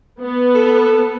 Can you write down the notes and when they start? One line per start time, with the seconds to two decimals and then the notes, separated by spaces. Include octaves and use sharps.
0.20 B3
0.55 A4